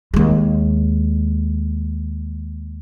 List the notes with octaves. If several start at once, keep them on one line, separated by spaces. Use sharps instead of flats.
D#2 G#3